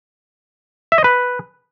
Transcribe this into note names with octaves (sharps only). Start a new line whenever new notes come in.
E5
D#5
B4